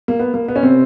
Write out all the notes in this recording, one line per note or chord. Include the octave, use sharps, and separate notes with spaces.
A#3
B3
A#3
B3
C#4
C3 C4